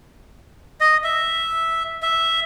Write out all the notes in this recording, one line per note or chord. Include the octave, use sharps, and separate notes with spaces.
D#5
E5
E5